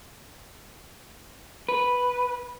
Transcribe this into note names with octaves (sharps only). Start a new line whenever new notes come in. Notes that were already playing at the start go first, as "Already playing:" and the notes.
B4